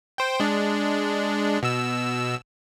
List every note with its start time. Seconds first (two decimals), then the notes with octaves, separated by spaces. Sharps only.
0.18 C5 G5
0.40 G#3 D4
1.63 B2 E6